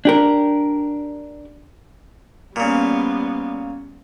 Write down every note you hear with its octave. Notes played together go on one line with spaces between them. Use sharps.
D4 G4 A#4
A#2 C#3 G3 B3